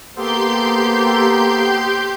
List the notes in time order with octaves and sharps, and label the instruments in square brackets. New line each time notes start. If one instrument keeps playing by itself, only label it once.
[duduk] A#3 [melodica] B3 A4 C5 [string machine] G4 C6 G6